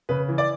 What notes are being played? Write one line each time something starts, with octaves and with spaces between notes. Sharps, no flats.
C#3 B4
E3
D5